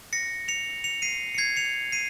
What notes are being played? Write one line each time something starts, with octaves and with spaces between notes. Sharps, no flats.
A#6 C#7
C#7 F7
C#7 F7
C7 D#7
C#7
G#6 C7
C#7 F7
C7 D#7